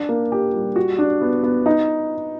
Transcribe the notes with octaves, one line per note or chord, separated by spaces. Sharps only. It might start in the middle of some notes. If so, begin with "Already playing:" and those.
Already playing: D4
A#3
G4
G3
F#4
D4
B3
B3
D#4